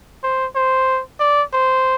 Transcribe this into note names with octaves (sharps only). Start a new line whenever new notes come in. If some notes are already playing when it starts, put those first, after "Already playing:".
C5
C5
D5
C5